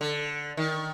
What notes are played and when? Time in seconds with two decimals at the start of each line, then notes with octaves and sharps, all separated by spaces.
0.01 D3
0.57 D#3